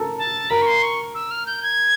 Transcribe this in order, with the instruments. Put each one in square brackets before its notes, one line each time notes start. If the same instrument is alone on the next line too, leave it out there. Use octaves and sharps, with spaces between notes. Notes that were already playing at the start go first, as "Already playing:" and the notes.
Already playing: [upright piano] A4 A#4
[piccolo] A5
[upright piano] A#4 [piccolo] B5
[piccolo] C#6
C6
C#6
E6
F6
G6
G#6